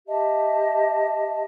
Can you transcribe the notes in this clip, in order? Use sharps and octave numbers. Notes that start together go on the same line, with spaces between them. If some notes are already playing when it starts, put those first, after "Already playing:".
G4 D#5 E5 A5